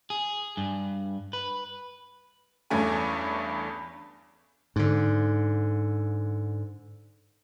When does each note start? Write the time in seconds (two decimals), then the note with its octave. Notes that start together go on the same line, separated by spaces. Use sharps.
0.10 G#4
0.57 G2
1.33 B4
2.70 E2 G2 A3 C#4 G#5
4.76 G#2 D3